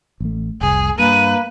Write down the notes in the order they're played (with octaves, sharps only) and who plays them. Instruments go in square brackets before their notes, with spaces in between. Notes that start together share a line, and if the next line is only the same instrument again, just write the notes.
[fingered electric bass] A1 A3
[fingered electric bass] F1 C2 [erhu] G#4
[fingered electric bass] G2 [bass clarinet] A#3 [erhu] B4 [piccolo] D#7